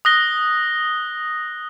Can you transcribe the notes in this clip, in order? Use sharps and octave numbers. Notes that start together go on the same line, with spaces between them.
D#6 F#6 A#6 G7